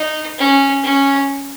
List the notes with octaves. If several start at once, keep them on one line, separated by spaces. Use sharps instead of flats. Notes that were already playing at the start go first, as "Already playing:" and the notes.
Already playing: D#4
C#4
C#4